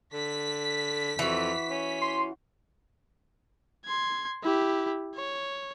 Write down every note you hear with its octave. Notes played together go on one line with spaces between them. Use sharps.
D3 B6
F2 E3 F#4
C#4
C6
C6 G#6
E4 G4
C#5